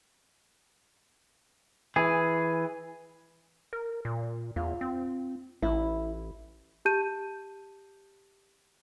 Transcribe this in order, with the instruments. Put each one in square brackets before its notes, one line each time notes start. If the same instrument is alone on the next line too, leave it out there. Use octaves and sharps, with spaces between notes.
[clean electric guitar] E3 G#4
[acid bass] A#4
A#2
[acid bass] E2 [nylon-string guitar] F4
[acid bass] C4
[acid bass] A1 [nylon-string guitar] E4
[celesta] G4 A5 G6 D#7